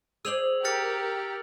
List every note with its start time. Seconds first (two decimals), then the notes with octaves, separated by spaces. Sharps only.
0.25 G#4 C5 D5 E6 F7 F#7
0.65 G4 A#4 F6 A6 C#7